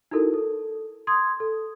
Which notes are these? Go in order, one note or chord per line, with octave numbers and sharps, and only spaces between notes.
D#4 E4 F#4 A4 A#4
A4
C6 D#6 G#6
A4